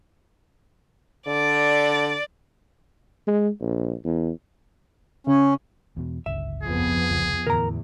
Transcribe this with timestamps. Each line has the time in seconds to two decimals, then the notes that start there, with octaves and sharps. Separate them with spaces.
1.27 D3 D5
3.27 G#3
3.61 A#1
4.05 E2
5.27 C#3 C#4
5.97 E2 B2
6.26 G1 C#2 E5
6.63 F2 F3 B3 G#4
7.10 F1 C#2
7.47 E2 A2 D3 E3 A#4 A#5